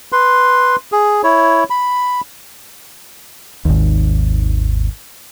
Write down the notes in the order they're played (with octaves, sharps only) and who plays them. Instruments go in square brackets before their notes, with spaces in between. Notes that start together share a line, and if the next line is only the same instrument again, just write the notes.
[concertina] B4 C6
G#4
E4 C#5
B5
[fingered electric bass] G#1 D#2